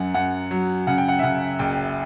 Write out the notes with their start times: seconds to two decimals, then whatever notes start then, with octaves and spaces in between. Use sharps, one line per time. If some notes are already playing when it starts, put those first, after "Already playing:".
Already playing: F#2 F#3 F#5
0.14 F#2 F#5
0.51 F#3
0.87 C#3 F#5
0.98 G5
1.08 F#5
1.19 E5
1.23 C#3 F#5
1.59 F#1 G5